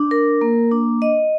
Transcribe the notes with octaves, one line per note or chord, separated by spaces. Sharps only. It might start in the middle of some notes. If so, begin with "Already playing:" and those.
Already playing: D4
A#4
A#3
D4
D#5